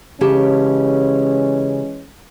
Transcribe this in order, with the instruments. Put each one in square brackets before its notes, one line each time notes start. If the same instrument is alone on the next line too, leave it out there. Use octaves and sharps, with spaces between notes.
[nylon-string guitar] C#3 G4 A5 [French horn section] E3 G#3 C#4